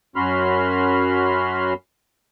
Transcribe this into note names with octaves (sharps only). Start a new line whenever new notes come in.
F#2 C#4 F#4 B5 C6 F6